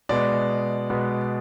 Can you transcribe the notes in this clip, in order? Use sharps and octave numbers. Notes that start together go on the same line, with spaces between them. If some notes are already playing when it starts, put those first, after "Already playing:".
B2 G#3 B3 D5
B2 G#3 B3